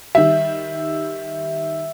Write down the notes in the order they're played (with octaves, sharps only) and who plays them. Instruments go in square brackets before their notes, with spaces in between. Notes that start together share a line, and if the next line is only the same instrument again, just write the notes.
[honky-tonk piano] D#3 G3 [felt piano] E5